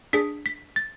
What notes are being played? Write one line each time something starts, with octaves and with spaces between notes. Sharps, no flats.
D4 G#4 B6
B6
A6